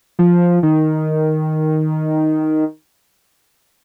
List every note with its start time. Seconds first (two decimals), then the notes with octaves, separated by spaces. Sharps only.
0.19 F3
0.63 D#3